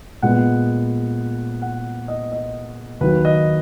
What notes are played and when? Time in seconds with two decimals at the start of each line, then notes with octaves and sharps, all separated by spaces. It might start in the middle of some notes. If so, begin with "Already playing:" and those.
0.22 A#2 G#3 B3 F#5
1.62 F#5
2.08 D#5
2.32 D#5
3.01 D#2 D#3 F#3 B4
3.25 D#5